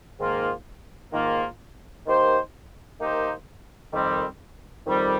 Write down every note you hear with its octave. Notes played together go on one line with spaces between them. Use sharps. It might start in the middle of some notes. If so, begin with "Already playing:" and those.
G#2 D#3 A#3 F4
G#2 D#3 A#3 F4
D#3 A#3 D#4 G4 C5
D#3 A#3 D#4 G4 C5
F2 D#3 G3 C4
F2 D#3 G3 C4